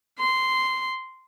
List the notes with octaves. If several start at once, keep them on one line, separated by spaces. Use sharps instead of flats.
C6